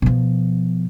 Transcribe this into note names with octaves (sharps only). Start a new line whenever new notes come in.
B2 F3